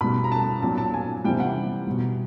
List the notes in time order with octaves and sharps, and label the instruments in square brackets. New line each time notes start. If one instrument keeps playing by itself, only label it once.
[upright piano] B2 G3 B5
A#5
A5
A#2 F#3 A5
A5
G#5
C3 E3 G3 G5
F#5
B2 G3